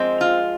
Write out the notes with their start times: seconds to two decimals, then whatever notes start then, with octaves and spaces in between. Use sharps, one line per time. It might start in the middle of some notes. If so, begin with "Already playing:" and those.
Already playing: F3 G#3 A#3 C4
0.21 F4